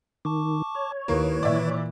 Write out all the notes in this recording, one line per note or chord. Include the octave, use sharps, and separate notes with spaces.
D#3 A5 C#6 D6
C#5
D#2 D#3 A#3 E4 B4
A#2 E3 D5 E5